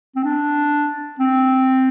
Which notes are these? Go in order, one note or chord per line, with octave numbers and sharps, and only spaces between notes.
C4
D4
C4